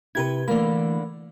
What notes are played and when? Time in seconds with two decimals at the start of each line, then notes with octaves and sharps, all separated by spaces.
0.15 C3 E4 G4 A#4 B4 G#6
0.48 D3 E3 A3 A#3 B5